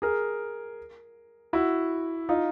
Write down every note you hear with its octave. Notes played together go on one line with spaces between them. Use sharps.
G#4 A#4
E4 F#4
D#4 F4